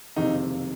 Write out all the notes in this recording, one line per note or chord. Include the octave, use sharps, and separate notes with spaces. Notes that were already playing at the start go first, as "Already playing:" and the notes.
F#1 F2 C3 D#3 D#4